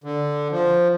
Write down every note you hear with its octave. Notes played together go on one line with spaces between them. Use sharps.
D3
F3